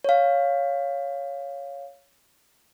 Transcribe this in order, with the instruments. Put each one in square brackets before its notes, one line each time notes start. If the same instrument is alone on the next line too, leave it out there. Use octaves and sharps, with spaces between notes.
[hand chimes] C#5 F5